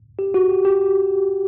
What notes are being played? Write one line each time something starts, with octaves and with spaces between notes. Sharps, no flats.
G4
F#4
G4
G4